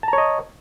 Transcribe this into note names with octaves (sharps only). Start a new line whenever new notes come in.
C#5 D#5 A5 A#5